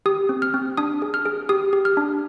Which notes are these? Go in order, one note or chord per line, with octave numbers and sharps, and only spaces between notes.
G4 D#6
C4
F6
C4
D4 D#6
G#4
F6
G#4
G4 D#6
G4
F6
D4